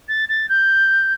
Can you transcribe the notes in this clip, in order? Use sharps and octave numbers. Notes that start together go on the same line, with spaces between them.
A6
A6
G6